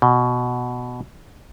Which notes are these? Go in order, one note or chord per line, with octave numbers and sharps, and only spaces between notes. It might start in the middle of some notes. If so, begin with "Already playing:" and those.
B2